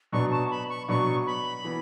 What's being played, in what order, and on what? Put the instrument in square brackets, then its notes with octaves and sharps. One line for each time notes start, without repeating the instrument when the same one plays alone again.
[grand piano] B2 F#3 B3 D4 [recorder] C#6
[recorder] A5
B5
C#6
[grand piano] B2 F#3 B3 D4 [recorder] C#6
[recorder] B5
[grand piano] E3 B3